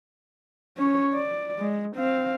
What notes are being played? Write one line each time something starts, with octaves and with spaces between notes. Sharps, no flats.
C#4 C#5
D5
G#3
C4 F5